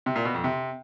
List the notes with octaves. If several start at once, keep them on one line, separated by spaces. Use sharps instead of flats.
C3
A#2
B2
F2
C3